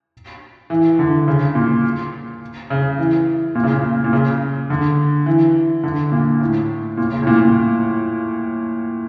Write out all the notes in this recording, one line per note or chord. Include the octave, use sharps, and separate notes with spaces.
E3
D3
C#3
A#2
C#3
E3
A#2
C#3
A#2
A#2
C#3
D3
E3
D3
A#2
A2
A#2
C#3
A2
A#2
A#2